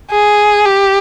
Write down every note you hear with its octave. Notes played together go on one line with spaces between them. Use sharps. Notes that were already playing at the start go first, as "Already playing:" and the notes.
G#4
G4